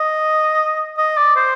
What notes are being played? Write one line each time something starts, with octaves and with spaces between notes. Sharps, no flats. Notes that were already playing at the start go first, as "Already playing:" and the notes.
Already playing: D#5
D#5
D5
C5